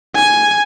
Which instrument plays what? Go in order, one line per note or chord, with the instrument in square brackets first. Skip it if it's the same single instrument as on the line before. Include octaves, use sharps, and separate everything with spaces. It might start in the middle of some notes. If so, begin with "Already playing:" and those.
[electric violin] G#5